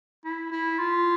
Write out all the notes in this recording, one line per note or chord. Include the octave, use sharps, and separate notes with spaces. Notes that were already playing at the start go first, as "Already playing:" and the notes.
E4
E4
F4